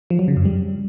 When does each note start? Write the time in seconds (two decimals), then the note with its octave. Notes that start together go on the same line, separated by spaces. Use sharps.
0.10 F3
0.19 F#3
0.28 C#3
0.37 F#2
0.45 G3